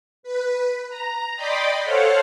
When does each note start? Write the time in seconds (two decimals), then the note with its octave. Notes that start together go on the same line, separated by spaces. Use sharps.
0.23 B4
0.88 A#5
1.36 D5 D#5 G5 B5 C6 D6
1.82 A4 C5 C#5 F5 F#5